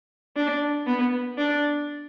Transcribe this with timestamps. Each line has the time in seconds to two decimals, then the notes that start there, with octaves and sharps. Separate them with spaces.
0.36 D4
0.87 B3
1.38 D4